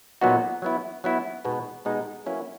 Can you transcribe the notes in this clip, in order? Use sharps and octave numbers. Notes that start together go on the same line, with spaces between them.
A#2 F#3 B3 D#4 F#4
F#3 B3 E4
F#3 B3 E4
B2 G#3 B3 D#4
B2 G#3 B3 D#4
F#3 A#3 C#4 E4 B4